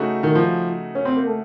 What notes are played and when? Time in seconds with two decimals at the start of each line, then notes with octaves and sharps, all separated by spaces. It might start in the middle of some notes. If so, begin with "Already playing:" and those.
Already playing: C#3 A3 D#4 F#4
0.23 D#3
0.35 F3
0.95 C#4
1.05 C4
1.16 A#3
1.26 A3